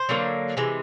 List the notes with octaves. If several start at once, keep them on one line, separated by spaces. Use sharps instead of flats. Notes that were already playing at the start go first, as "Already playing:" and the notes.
Already playing: C5
D3 F#3 A#3
C3 E3 G#3